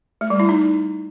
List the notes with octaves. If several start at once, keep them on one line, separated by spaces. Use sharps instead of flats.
A3
G3
E4
D#4